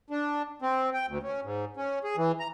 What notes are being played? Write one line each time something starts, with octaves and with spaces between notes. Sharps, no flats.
D4
C4
G5
D2
C#4
G#2
C#4
G#4
E3
A#5